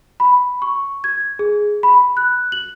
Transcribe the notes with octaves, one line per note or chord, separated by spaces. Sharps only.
B5
C#6
G#6
G#4
B5
F#6
F#7